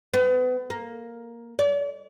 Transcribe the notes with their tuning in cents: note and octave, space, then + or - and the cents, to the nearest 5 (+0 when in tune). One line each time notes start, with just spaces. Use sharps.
B3 +35
A#3 +5
D5 -45